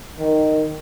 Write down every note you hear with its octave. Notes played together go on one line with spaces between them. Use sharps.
D#3